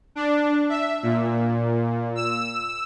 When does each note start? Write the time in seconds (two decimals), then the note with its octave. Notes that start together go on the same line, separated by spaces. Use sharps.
0.15 D4
0.69 E5
1.03 A#2
2.15 E6